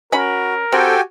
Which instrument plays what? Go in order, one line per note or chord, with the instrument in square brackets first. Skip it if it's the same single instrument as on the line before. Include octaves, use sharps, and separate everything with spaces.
[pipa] C#4 B5 [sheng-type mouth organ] F#4 [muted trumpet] A#4
[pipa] C4 [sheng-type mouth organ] F#4 G4 G#5 [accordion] A4 G5